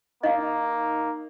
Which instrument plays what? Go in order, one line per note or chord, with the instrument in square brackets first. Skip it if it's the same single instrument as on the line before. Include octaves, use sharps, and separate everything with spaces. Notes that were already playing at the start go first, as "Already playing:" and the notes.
[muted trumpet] A#3 [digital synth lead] D#4 [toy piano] D#5 F5